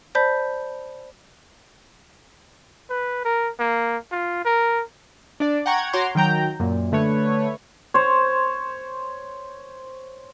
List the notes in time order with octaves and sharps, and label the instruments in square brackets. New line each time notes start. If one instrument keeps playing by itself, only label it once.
[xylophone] C5 D5 A5 B5 G6 B6
[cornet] B4
A#4
A#3
F4
A#4
[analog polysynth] D4 D5
F#5 G5 A#5 C#6 G#6
F#4 C#5 A#5 C6 D6
D#3 F#3 G5 A#5 G6
F#2 A#2
D3 A3 B4 C#5
[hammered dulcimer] C5 C#5